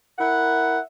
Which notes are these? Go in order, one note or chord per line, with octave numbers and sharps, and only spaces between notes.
E4 A#4 E5 F#5